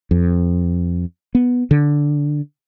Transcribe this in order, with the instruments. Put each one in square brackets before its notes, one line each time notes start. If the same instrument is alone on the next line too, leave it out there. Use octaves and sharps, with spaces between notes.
[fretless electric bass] F2
B3
D3